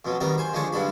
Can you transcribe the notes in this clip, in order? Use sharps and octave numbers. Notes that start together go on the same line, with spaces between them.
F2 B2 F#3
D#3 G3 B3 A#4
C5 G#5
D3 F3 G#3 D4 C#5
B1 G2 D3 D4 B5